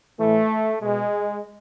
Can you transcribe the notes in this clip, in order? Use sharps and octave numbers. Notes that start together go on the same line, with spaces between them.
A2 E3 A3
B2 G#3